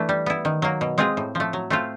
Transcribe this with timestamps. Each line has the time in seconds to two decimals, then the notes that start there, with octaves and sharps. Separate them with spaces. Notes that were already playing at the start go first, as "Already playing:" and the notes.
Already playing: E3 A3 D4
0.09 G3
0.26 B3 E4
0.45 D#3
0.62 F#3 A#3
0.81 B2
0.98 G#3 C4 F4 G#4
1.17 A2
1.35 F3 A3
1.53 F#3
1.70 A3 C4 F4